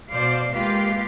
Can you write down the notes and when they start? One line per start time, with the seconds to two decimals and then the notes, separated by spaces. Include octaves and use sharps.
0.11 B2 C5 D5 F5
0.52 G#3 A#3 F4 G4 B4 F5